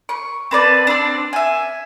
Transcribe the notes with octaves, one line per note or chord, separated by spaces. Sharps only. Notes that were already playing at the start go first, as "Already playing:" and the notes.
C#6
C4 B4 D5 A5
C4 D4
E5 G#5